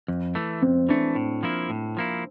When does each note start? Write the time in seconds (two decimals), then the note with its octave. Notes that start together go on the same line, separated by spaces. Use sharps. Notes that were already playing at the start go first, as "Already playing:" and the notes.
0.08 F2
0.35 E3 A3
0.62 F2 C4
0.89 E3 A3 D4
1.15 A2
1.43 F3 A#3 E4
1.70 A2
1.97 F3 A#3 E4